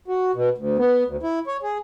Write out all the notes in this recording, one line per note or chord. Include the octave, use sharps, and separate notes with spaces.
F#4
B2
D2
B3
D2
E4
C#5
G#4